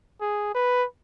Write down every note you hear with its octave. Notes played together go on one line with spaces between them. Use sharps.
G#4
B4